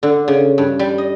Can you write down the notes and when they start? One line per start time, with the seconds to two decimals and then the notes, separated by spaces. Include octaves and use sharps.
0.03 D3
0.28 C#3
0.58 G2
0.79 G3
0.98 D#5